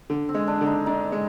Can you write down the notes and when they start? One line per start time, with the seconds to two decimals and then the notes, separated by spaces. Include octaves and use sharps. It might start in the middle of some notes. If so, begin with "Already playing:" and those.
0.10 D3
0.29 C4
0.34 G#3
0.48 D4
0.61 D3
0.66 D#4
0.86 D4 D#4
1.12 G#3